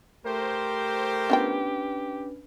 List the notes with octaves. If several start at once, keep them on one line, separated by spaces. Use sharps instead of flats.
A3 G4 A#4 C5
B3 C#4 D4 F4 B4 G5